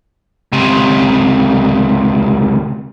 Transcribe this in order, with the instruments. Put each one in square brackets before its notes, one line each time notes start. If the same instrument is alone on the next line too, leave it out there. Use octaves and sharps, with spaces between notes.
[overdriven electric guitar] C#2 C3